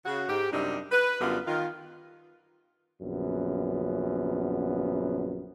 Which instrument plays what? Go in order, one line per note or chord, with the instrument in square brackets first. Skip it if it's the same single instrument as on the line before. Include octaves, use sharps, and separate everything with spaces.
[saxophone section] C#3 F#4
G#2 G4
F#2 C3 G3 D4 D#4
B4
F#2 D3 G3 B3 F4
D#3 F4
[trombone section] A#1 F#2 C#3 B3